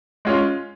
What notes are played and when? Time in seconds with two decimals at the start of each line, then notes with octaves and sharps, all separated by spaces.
0.25 G#3 C#4 F4